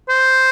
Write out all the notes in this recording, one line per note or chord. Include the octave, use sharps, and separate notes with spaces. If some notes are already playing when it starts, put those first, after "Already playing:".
C5